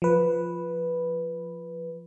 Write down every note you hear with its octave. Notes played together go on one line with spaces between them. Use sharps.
F3 B4